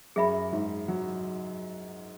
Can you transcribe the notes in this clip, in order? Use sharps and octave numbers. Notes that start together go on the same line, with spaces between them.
F#2 G#4 E5 B5
G#2
F#3